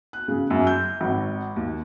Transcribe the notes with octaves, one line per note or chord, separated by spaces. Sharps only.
F#6
C#3
F#2
G6
G#1
D#2